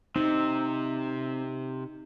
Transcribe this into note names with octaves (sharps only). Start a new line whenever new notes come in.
C3 C4 D#4